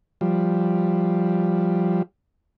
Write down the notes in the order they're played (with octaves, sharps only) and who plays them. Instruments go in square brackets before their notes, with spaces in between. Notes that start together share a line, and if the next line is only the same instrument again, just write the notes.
[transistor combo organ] F3 G3